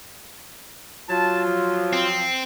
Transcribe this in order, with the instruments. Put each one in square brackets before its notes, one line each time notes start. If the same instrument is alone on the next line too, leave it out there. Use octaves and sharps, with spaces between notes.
[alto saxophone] F#3 [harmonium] F4 [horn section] A5
[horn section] F3
[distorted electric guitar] C4